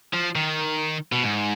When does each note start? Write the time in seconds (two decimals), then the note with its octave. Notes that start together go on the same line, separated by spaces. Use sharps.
0.13 F3
0.36 D#3
1.12 B2
1.23 G#2